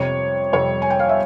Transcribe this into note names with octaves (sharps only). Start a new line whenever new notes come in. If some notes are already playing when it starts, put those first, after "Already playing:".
Already playing: F2 C3 G3 C#5
F2 C3 G3 C#5
G#5
G5
F5
E5